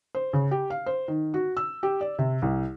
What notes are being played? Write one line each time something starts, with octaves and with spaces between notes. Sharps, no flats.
C5
C#3
G4
F5
C5
D#3
F#4
E6
G4
D5
C3
C2